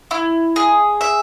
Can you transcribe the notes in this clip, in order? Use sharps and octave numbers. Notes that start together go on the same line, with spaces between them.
E4
G#4
E5